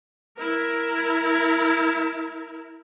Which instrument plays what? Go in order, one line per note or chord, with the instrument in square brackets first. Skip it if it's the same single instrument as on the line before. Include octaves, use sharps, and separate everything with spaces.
[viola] E4 A#4